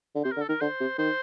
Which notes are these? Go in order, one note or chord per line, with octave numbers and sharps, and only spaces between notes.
D3
C3 C5
A#4
D3
A4
D#3 A#4
D3 C5
C3
D#3 C5